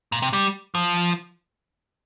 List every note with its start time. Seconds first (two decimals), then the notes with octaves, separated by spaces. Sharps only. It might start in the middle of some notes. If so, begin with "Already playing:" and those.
0.12 A#2
0.22 C3
0.33 G3
0.75 F3